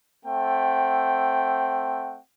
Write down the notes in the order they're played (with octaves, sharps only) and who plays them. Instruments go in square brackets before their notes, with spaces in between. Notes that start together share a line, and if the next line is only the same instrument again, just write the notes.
[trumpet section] A3 C4 F#5 G5